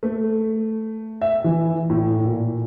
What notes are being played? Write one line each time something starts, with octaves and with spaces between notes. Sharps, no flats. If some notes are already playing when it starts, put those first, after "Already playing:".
A3
E5
E3
A2
A#2